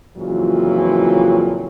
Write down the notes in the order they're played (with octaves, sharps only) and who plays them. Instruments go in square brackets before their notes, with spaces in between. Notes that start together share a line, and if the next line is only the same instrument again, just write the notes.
[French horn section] F2 A#2 C#3 E3 F#3